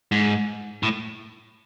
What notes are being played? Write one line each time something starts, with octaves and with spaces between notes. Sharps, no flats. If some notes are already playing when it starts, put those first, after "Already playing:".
G#2
A2